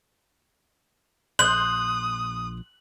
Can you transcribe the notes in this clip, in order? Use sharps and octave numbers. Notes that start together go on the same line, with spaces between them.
A#1 C6 D#6 F#6 G6 F#7